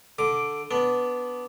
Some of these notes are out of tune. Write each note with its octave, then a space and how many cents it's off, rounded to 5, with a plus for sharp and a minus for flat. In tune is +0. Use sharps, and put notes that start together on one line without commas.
D3 +0 D6 +0
B3 +0 D4 -10